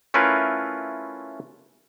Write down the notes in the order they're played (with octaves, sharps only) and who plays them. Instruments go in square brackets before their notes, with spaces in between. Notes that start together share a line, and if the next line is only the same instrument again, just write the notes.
[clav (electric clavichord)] A3 C#4 E4 F4 A#4 B4